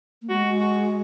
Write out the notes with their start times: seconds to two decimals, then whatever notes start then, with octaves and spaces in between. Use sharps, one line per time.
0.22 A#3
0.29 G#3 F#4
0.60 F#4